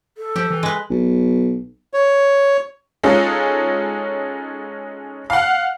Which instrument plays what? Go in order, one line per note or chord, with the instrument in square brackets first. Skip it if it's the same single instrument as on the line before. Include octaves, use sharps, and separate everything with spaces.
[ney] A4
[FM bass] F3 [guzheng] G4
[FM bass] E3
[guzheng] G#3 B4
[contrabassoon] B1
[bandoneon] C#5
[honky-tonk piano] G#3 C#4 D#4 F4 A4
F5 F#5